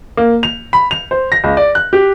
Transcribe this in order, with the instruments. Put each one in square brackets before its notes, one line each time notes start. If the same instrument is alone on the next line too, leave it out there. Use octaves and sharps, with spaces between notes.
[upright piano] A#3
F7
B5
F7
C5
A#6
C#2
D5
F#6
G4